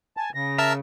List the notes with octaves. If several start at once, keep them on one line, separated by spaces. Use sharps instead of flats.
G#5 A5
C#3 A#6
A#4 E5 A5 E6